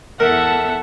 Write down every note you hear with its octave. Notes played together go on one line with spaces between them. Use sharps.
E2 A4 A#4 E5 F#5 A5